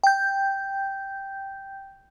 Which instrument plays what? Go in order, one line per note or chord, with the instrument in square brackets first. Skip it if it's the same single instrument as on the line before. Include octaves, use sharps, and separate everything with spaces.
[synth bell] G5 G6